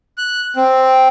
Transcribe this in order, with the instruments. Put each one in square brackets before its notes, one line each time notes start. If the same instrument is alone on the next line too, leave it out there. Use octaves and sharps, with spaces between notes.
[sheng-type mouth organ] F#6
C4